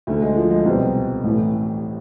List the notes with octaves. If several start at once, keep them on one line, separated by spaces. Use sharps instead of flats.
D2 D3 A3
G#3
F3
G#3
C2 B2 C4
A1 A2 E3